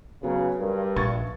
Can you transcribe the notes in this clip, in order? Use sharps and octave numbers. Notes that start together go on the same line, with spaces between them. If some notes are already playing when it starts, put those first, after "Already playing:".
C#3 F#3 B3
G2 A#4
A#1 C#6 G#6 A6